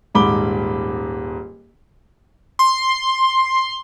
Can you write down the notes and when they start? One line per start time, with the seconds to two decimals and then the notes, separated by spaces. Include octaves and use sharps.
0.15 D#1 G#2 B5 D6 G7
2.59 C6